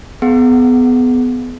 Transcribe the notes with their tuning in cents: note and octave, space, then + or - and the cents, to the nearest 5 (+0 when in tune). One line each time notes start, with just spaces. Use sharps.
B3 +20 G#4 +35 F#5 +0